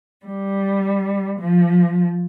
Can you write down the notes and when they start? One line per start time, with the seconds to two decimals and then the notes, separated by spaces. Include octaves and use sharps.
0.25 G3
1.39 F3